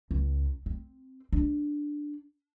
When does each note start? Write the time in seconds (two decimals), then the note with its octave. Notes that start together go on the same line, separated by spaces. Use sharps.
0.11 C#2
0.66 C4
1.33 D4